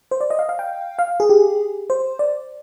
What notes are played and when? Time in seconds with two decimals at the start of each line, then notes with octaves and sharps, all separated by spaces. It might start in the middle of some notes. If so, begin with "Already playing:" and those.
0.11 C5
0.21 D5
0.30 D#5
0.39 F5
0.49 F5
0.59 G5
0.99 F5
1.20 G#4
1.30 G4
1.90 C5
2.19 D5